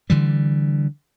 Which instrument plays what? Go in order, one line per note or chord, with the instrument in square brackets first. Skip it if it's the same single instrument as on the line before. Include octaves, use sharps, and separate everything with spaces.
[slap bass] D3 E3 G3